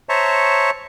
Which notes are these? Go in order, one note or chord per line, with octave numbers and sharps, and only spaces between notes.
C5 C#5 E5 A5 A#5 C#6